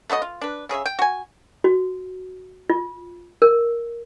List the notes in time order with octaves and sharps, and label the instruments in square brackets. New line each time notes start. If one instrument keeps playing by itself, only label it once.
[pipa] A3 B3 F#4 D#5
F4
D4 B4
C#3 G#4 C#5 E5
G5
F#4 G#5
[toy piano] F#4
F4
A#4